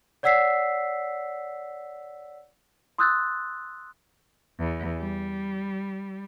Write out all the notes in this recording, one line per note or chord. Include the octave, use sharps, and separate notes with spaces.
C#5 D5 F#5 E6 B6 C7
C6 D#6 E6 F#6 G6 A6
E2
G3